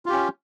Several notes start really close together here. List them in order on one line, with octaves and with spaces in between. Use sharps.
F4 G4 C#4